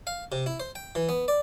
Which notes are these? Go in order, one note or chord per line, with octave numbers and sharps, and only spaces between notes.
F5
C3
E4
C5
G5
E3
B3
D5